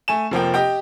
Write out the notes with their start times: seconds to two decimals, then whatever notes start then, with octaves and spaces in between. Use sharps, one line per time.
0.08 A3 G#5 E7
0.31 F1 F3 A#3 G5
0.54 G4 D#5 G5